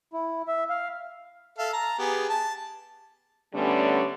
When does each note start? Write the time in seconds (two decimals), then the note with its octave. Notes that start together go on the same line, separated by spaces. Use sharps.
0.13 E4
0.48 E5
0.70 F5
1.59 A4 E5 F5
1.73 A5 A#5
1.99 B3 G4 G#4
2.29 A5
3.54 D3 G3 A3 B3 C#4